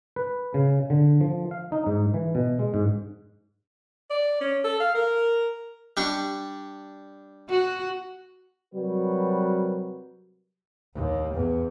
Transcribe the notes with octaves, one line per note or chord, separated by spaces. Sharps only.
B4
C#3
D3
F3
F5
D#4
G#2
E3
B2
G#3
G#2
D5
C#4
A4
F5
A#4
G3 D4 C#6
F#4
C3 F#3 G3 F#4 A#4 B4
D#2
E2